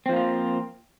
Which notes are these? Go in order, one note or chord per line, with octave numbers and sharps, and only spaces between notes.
F3 A#3 C4 F4